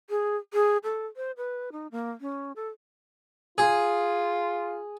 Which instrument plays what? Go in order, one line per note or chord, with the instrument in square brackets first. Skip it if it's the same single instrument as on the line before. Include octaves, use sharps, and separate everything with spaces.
[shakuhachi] G#4
G#4
A4
C5
B4
D#4
A#3
C#4
A4
[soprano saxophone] F4 [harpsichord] G#4